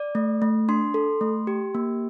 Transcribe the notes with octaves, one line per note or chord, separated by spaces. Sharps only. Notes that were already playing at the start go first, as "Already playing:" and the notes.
Already playing: D5
A3
A3
D4 C6
A4
A3
G4
A#3